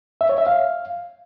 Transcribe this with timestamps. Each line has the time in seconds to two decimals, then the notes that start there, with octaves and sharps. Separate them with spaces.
0.21 E5
0.29 C#5
0.38 E5
0.47 F5